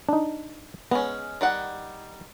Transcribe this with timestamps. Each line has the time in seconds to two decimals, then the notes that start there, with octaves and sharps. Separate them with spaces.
0.09 D4 D#4
0.91 G#3 B3 C#4
1.41 D#3 G3 F#5